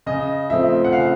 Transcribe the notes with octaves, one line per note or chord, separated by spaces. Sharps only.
C#3 D#5
F3 A3 C4 E5
F#5
C#3 F5